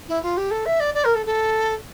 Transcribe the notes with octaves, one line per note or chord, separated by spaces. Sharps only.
E4
F4
G4
A4
E5
D5
D5
A#4
A4
A4